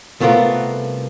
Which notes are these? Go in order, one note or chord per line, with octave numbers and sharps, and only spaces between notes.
C2 A3 B3 F4 A#4 F#5